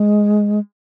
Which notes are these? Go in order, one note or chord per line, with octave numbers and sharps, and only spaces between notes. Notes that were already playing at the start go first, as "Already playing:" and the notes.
Already playing: G#3